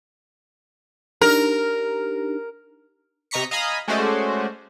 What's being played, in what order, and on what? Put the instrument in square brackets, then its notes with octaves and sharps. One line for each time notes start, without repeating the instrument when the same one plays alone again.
[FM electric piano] D4 D#4 G4 [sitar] A#4
[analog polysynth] C3 D#5 A#5 C#6 B6 C#7
D#5 F5 G#5 A#5 B5 D#6
G#3 A3 C#4 F#4 C5 D5